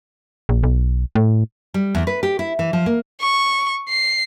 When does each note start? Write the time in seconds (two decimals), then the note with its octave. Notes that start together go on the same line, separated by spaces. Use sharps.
0.49 A#1
0.63 B1
1.15 A2
1.74 G3
1.95 E2
2.07 B4
2.23 G4
2.39 E4
2.59 E3
2.73 F3
2.86 A#3
3.21 C#6
3.89 C7